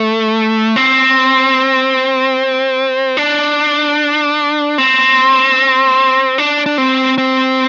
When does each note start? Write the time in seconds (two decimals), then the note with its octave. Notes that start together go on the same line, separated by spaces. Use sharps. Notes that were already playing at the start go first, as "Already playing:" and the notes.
Already playing: A3
0.76 C4
3.17 D4
4.78 C4
6.38 D4
6.66 D4
6.78 C4
7.18 C4